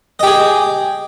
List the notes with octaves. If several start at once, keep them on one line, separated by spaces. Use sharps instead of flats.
G4 G#4 D#5